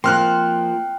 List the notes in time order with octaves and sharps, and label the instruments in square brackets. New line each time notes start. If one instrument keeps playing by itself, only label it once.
[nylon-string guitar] F3 [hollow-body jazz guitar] A#3 C4 [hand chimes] G5 [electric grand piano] C6 F6 F#6